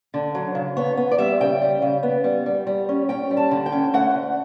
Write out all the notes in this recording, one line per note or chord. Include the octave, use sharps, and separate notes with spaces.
D3
F#3
C#3
B3 C#5
B3
D5
G3 E5
C#3 G5
G3
C#3
B3
G3
G3
G3
C#4
C#4 G5
G3
A5
D3
G5
C#4
A3 F#5
D2